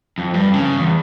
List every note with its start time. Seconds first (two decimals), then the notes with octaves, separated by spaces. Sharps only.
0.18 F2
0.34 G2
0.54 C#3
0.76 E2